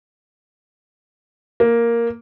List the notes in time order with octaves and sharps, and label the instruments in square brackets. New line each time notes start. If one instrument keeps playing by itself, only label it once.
[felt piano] A#3